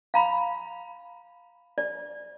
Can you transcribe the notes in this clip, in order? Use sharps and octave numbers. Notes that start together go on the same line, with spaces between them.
F5 A#5 B5
D5